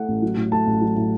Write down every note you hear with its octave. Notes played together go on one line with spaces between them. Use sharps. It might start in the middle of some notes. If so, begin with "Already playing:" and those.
Already playing: A3 F#5
A1
F#3
A2
A3 A5
A1
F#3
A2